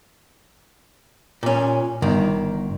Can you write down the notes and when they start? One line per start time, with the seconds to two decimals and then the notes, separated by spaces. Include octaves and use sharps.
1.43 A#2 C#4
2.02 G1 D#3